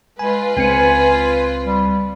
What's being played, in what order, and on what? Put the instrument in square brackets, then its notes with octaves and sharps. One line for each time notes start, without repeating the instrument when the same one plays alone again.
[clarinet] G#3 [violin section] F4 B4 [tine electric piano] G#5
[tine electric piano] C#2 C4 C#7 [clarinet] G#5
[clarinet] G3